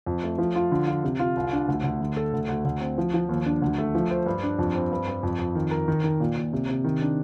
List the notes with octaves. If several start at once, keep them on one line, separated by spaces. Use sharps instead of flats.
F2
A3
F3
F4
D3
F4
C3
F4
C2
D4
D2
D2
D3
A4
D2
D2
D2
C4
F3
F3
D#2
D4
D2
A3
F3
C5
G2
D4
F2
C4
G2
G2
F2
F2
D#3
A#4
D#3
D#3
A#2
A#2
C3
C3
D#3
D4